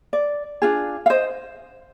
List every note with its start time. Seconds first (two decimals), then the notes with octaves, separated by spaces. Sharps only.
0.13 D5
0.62 D4 F4 G#4
1.06 F5
1.10 C5 D#5